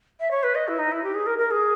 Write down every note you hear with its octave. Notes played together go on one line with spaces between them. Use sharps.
E5
C#5
B4
D#5
E4
D#4
E4
G4
G#4
A#4
A#4
G#4